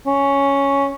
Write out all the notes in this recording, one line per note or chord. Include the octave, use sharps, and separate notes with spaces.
C#4